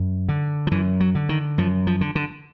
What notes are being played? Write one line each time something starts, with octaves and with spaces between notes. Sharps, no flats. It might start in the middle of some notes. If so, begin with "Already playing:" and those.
Already playing: F#2
D3
F3
F#2 E3
F#3
D3
D#3
F#2 F3
F3
D3
D3